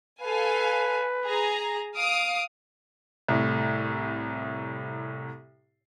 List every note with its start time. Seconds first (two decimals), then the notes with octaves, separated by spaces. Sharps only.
0.21 A4 B4 F5 G#5
1.25 G#4 A#5
1.96 F5 D#6 D7
3.28 C2 A2